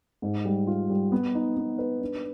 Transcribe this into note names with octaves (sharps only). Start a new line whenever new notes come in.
G#2
G3
F4
G3
B3
D#4
B3
B4
D4